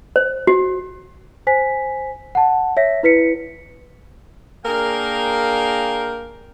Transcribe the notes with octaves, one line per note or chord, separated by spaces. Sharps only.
C5
F#4
C5 G#5 B6
F#5 A5
C#5 E5 A#6 B6
E4 B4 B6 C#7
A#3 D4 G#4 A#4 F5 G5